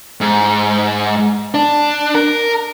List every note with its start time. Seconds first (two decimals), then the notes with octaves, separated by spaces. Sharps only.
0.21 G#2
1.54 D4
2.15 A#4